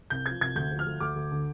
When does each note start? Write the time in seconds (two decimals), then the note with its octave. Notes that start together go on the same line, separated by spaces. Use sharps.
0.10 C2 G6
0.26 F3 G#6
0.41 C2 G#6
0.56 D2 G6
0.71 F3
0.79 F6
0.86 D2
1.00 D2 D6
1.16 D2
1.32 D3